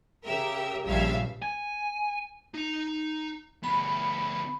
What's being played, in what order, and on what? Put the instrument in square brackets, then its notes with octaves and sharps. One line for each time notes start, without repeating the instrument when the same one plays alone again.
[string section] C#3 G4 A#4 E5
A#1 G2 C#3 E5 F5
[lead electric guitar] G#5
[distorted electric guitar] D#4 A#5
[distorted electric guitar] D2 B3 [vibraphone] B5